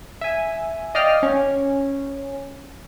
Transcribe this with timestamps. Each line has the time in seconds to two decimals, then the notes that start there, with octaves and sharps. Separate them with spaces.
0.21 E5 G#5
0.95 D5 D#5 F5 G5 F6
1.23 C#4